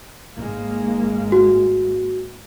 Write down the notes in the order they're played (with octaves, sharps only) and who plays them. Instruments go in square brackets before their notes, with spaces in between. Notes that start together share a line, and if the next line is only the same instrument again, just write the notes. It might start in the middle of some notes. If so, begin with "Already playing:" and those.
[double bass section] G#1 G#3 A#3
[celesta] F#4